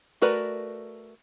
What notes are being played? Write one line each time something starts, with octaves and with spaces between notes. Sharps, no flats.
A3 F#4 A#4 B4 D5